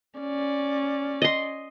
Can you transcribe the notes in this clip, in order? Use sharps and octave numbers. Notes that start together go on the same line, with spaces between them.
C#4 D5
D#5 C6